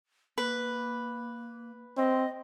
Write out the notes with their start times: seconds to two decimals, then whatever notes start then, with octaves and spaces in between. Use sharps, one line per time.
0.38 A#3 B4
1.97 C4 D#5